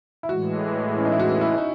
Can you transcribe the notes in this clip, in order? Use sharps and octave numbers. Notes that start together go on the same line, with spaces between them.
E4
A2 E3 G#3 F#4
C#4
D#4
E4
F#4
E4
D#4